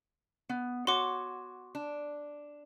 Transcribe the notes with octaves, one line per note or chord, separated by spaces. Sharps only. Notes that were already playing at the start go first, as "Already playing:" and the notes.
B3
F#4 C#5 F#5 C6 D6
D4